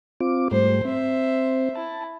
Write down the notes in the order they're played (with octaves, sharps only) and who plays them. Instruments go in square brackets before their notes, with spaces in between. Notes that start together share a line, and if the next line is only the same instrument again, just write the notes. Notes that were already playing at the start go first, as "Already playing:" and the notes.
[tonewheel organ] C4 F4 D6
[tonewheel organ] G#2 G3 A3 [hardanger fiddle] C5
[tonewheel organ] C4 [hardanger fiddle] C5 E5
[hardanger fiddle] E4 [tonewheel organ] A5